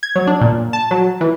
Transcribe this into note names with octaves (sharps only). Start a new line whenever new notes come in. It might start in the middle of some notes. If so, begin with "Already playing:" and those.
G#6
F#3
D4
A#2
A5
F#3
E3